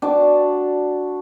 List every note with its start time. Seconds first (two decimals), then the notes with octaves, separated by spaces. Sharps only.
0.02 D4 F#4 A5